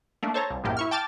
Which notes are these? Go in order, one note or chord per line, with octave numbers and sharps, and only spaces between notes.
A3 A#3 D4
A4 C5 C#5 A5 A#5
C2
A#1 F#2 A2 A#3 G4
E4 C#6 F6
G5 A5 D6 F6 A6